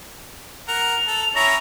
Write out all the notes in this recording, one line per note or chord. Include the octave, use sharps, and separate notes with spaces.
A#4 F#5 F7
A4
C#4 E4 C#5 A#5